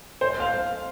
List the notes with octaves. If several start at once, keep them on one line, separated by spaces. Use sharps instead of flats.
C5
F5